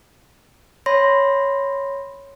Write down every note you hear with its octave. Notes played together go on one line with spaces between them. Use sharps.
C#5 B5 C6 A#6